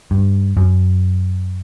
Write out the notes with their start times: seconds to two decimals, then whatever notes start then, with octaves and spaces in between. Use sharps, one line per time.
0.11 G2
0.57 F#2